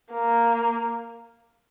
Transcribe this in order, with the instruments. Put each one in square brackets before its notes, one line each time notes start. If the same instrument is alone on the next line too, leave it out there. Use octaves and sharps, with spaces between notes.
[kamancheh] A#3